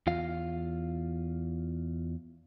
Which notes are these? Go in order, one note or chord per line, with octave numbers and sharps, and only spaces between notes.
E2 F4 F5